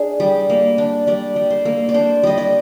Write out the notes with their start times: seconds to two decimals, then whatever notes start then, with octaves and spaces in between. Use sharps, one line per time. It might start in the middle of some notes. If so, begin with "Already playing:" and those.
Already playing: D4 G#4
0.20 G3
0.50 A#3
0.78 D4
1.07 G3 D5
1.36 G3
1.50 C5
1.65 A#3
1.89 D5
1.94 D4 C5
2.23 G3 D#5
2.38 D5